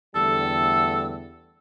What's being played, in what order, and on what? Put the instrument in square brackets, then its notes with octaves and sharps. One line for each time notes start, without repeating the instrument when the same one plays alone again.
[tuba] E2 [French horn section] D3 G3 A3 [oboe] A4 [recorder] E6